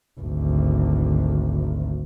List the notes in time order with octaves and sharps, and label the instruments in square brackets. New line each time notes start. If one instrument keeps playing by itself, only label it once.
[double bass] G#1 D2